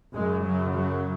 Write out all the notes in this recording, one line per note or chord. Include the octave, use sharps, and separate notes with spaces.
F#2 C#3 G#3
F#3
F#3